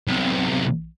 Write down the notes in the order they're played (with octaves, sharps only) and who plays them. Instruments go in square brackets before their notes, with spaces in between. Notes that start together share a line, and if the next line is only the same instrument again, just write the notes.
[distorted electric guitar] B1 C3